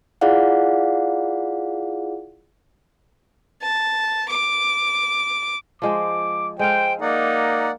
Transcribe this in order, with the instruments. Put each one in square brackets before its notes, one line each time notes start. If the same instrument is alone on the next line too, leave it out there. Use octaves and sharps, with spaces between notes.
[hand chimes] E4 F4 G#4 D5 F5 F#5
[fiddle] A5
D6
[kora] F3 G#3 C5 [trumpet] D6
[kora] G#3 A4 F5 [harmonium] C5 [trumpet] G5
[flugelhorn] A#3 [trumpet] D#4 [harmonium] D5 F#5